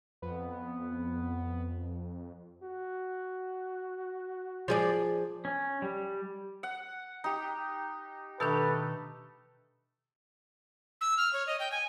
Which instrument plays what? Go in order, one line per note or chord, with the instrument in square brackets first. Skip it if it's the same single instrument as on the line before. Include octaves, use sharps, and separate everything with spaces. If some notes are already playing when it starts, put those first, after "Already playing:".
[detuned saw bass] F2 [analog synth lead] B3
[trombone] F#4
[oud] F3 G#4 D5
[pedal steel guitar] C#4
G3
[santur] F#5
D#4 G4
[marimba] B2 D#3 D4 [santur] A3 A4 [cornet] B4
[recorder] E6
F6
C#5
D#5
G5
G#5